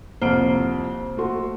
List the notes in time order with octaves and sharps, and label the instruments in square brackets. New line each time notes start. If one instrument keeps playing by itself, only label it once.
[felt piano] C2 F2 D7 [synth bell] A#3 C5
[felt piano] A3 F#4 C6